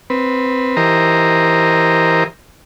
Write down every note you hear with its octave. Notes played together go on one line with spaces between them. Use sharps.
C4 B4
E3 G4 A#4 C5 D#5 A#5